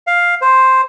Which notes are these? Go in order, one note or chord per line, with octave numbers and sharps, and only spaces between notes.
F5
C5